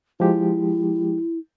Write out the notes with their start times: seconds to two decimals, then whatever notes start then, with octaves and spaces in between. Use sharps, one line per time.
0.20 F3 G#3 E4 G4